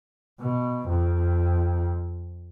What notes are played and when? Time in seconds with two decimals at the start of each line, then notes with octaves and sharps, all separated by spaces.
0.40 B2
0.89 F2